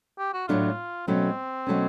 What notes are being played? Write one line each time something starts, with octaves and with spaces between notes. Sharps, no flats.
G4
F#4
A2 F#3 A3 D4 F4
B2 F#3 A3 C4 C#4
B2 F#3 A3 C#4